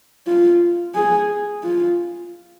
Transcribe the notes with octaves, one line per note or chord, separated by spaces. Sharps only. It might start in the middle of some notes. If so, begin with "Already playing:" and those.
F4
G#4
F4